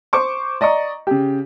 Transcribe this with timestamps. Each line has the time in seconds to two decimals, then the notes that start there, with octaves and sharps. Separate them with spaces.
0.13 C5 C#6 D6
0.61 D5 D#5 A#5 C#6
1.07 C#3 G4